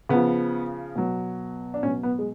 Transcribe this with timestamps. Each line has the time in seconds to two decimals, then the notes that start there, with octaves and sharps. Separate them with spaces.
0.09 C#3 F3 B3
0.96 B2 F#3
1.74 D4
1.83 B2 F#3 C#4
2.03 B3
2.19 G#3